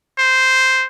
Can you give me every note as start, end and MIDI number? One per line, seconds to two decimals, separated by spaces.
0.19 0.86 72